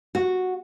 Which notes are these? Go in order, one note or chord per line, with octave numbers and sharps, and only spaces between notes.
F#4